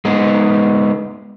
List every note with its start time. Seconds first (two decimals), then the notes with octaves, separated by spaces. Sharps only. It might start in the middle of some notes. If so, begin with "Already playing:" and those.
0.05 G#3 B3 D#4